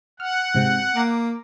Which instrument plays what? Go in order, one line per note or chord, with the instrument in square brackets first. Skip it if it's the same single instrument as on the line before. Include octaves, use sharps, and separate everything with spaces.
[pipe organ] F#5 [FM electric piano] F6
[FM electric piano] G#2 C3 G5
[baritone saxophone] A#3 [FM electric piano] A#5 D6